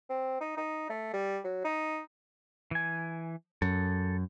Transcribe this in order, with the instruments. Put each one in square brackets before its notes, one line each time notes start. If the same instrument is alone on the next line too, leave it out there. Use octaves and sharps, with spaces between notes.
[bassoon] C4
D#4
D#4
A3
G3
F#3
D#4
[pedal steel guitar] E3 G#5
[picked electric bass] F#2 [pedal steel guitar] A4